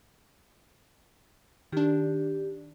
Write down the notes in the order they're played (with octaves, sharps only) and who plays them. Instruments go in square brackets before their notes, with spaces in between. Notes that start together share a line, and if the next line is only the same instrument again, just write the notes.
[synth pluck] D#3 D4 [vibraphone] G4